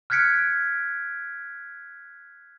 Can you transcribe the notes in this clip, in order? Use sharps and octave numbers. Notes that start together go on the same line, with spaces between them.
F6 F#6 G#6 B6 C#7 D7